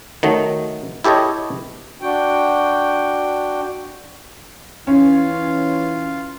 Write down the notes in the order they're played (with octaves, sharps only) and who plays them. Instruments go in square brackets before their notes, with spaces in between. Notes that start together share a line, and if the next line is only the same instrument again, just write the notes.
[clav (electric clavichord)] D#3 F#3 A3 D#4
E4 G4 A4 C#5 D#5
[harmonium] D4 F#4 G5
[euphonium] E3 [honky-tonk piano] C#4 [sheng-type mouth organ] F4 F5